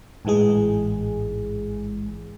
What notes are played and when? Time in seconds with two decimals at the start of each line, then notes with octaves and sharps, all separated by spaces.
0.25 A1 G#2 E3 G#3 G#4